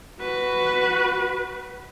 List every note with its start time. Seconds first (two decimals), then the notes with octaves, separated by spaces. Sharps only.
0.21 F#4 B4